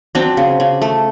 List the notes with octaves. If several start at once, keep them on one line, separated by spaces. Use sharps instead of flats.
F#3 C4 D4
C#3
C#3
A3